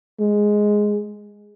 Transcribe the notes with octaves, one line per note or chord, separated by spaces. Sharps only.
G#3